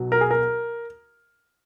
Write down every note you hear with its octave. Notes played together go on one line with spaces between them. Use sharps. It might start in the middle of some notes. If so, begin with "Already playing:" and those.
Already playing: B1 B2 F#3
A#4
G#4
A#4